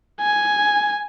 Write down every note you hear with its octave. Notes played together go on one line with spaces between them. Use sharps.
G#5